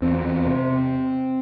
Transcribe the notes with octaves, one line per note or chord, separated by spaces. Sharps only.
E2 C4
E2
C3